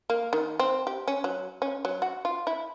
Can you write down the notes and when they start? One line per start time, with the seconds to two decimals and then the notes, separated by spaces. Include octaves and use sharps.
0.10 A#3
0.33 D#3
0.59 C4
0.87 G4
1.08 C#4
1.24 F#3
1.62 C#4
1.85 F#3
2.02 F#4
2.25 F4
2.47 E4